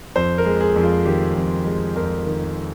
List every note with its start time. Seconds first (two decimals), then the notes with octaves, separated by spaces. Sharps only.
0.16 F2 C5
0.38 A#4
0.45 G#3
0.60 G#4
0.76 F2
0.83 F4
1.05 D#3 G4
1.35 F2
1.65 G#3
1.95 F2 A#4
2.26 D#3